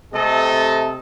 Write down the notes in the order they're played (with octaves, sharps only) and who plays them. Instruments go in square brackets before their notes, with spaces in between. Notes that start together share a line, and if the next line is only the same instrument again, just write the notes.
[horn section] C3 A3 A4 D#5